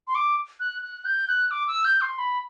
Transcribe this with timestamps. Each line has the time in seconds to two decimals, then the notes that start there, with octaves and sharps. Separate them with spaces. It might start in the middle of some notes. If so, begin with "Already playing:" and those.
0.08 C6
0.15 D6
0.60 F#6
0.83 F#6
1.05 G6
1.28 F#6
1.51 D6
1.68 E6
1.85 G6
2.01 C6
2.18 B5